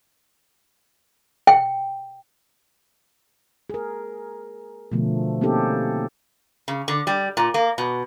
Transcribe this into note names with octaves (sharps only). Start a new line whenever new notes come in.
G5
G#4 A#4
B2 D3 F3 A3
A#3 C4 C#4 D#4 G4 A4
C#3
D3
G3
A#2
A#3
B2